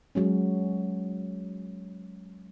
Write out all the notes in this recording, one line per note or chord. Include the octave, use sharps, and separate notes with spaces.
F#3 G#3 C#4